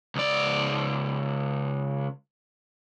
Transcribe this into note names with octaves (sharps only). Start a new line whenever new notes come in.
C#2 D5